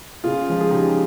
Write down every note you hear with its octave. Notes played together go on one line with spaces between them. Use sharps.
C#3 F4 G#4
F3 G#3
G#4
C#3 D#4 G4